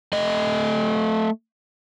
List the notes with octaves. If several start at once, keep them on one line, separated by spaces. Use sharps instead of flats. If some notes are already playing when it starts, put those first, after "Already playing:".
A3 D#5